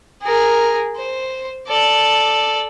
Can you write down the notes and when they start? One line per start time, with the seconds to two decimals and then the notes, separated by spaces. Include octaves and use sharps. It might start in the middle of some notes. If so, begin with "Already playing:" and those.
0.23 G#4 A#4
0.96 C5
1.68 A4 D5